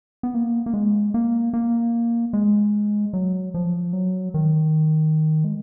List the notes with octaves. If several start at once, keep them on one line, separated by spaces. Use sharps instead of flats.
B3
A#3
A#3
G#3
A#3
A#3
G#3
F#3
F3
F#3
D#3
G#3